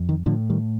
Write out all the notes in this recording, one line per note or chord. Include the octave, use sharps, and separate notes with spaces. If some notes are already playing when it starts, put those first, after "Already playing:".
Already playing: F2
D#3
A2 D3 F3
D#3 G3